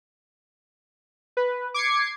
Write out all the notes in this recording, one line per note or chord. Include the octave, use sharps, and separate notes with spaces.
B4
D6 G#6 C7 C#7